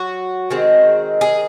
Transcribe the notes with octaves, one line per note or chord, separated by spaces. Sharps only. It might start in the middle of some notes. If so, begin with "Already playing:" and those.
Already playing: F#3 F#4
D#3 G#3 C4
G#4